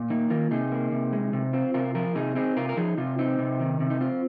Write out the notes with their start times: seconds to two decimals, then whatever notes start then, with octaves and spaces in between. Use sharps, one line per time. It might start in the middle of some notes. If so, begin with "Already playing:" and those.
Already playing: A#2
0.10 A#3 D#4
0.30 D#3 F4 A#4
0.51 C3 D#4 G#4
0.72 A#3
0.92 C3
1.13 G#3
1.33 C3
1.53 C4 F4
1.74 C3 F4 A#4
1.95 F3 F4 A#4
2.15 C3 D#4 G#4
2.35 C4 D#4 G#4
2.57 C3 F4 A#4
2.69 A#4
2.77 F3 D#4 G#4
2.97 C3 F4
3.19 C4 D#4
3.39 C3
3.60 D#3
3.80 C3
3.90 D#4
4.01 C4 F4